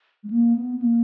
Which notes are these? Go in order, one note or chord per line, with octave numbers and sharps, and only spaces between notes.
G#3
A#3
B3
B3
A#3